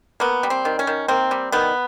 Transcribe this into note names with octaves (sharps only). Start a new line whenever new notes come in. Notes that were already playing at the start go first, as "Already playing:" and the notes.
A#3 B3
G3
C4
D#3
C#4
D#3
A#3 C4
G3
D#3 B3